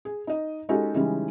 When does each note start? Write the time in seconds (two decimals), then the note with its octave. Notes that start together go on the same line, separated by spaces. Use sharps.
0.05 G#4
0.27 D#4 D#5
0.69 G#3 C#4 D#4 F#4 G4 A4
0.94 C#3 E3 G3 G#3 C#4 D#4